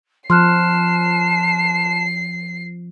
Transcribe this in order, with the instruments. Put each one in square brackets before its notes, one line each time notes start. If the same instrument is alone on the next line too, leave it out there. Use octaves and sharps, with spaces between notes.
[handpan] F3 [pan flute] A5 [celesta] C6 F6 F#6 [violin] C7